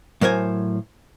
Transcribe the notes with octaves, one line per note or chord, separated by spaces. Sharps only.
A2 F#3 A#4 C5 G#5